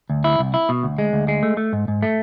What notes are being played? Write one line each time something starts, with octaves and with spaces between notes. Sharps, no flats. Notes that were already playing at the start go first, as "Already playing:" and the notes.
D2
E4
C2
E4
B2
D2
G#3
D2
G#3
A3
A3
G#2
G#2
A3